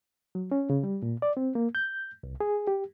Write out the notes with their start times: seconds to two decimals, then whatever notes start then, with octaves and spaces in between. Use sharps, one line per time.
0.35 F#3
0.51 C#4
0.70 C#3
0.83 G3
1.03 A#2
1.22 D5
1.37 C4
1.55 A#3
1.75 G6
2.23 C2
2.41 G#4
2.67 G4